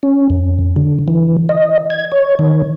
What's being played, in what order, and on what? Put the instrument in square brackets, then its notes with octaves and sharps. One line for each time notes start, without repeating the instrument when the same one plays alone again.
[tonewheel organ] C#4
F2
D3
E3
D#5
G#6
C#5
D#3